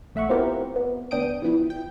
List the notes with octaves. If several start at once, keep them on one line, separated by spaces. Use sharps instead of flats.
A#1 A3 E5 F#5 C#6
B3 C4 E4 F4 G4 A#4
B3
D2 B3 D4 G5 D#6 D7
E3 F3 B3 E4
G5